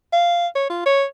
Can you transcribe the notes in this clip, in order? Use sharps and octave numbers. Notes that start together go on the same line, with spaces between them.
F5
C#5
F4
C#5